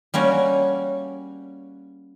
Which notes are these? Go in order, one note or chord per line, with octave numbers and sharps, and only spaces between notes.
G3 A#3 C#4 F#4